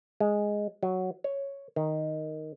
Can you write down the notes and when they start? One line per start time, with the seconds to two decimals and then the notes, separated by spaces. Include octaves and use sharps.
0.20 G#3
0.83 F#3
1.24 C#5
1.76 D#3